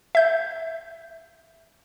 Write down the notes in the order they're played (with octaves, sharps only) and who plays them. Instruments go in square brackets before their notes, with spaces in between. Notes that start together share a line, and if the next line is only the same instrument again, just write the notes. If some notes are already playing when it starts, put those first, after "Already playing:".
[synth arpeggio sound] E5 G6